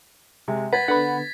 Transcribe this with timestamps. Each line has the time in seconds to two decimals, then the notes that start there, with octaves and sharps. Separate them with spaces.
0.48 C3 G#3
0.73 B4 F#5 G#6 A6 B6
0.88 D3 B3 F#5 B5